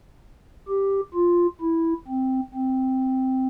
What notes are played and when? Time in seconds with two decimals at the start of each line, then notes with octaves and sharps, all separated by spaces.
0.68 G4
1.15 F4
1.61 E4
2.07 C4
2.54 C4